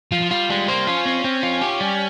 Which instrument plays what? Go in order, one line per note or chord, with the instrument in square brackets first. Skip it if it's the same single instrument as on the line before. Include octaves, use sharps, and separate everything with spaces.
[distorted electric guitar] F3 [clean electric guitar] F4
[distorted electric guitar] F3
[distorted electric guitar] G3 [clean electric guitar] F4
[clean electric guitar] G3 [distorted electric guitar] G#3
[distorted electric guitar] A#3 [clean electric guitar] C5
[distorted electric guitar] C#4 [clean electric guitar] F4
[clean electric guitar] C4
C4
F4
G4
G3